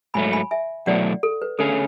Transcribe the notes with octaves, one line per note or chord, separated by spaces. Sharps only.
G#2 F#3 A3 G#5 B5
G#5 B5
E5 G#5
B2 F#3 A3 E4 D5 F#5
A4
B4
D3 A3 C#4 G#4 A4